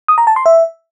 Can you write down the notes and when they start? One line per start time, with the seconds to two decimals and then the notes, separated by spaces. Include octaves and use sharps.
0.08 D#6
0.18 A#5
0.27 A5
0.36 C6
0.46 E5